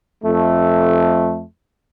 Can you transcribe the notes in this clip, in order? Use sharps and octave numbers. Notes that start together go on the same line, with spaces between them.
F2 A3